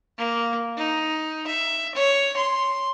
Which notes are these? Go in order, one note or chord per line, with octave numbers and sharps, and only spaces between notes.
A#3
D#4
E5
C#5
C6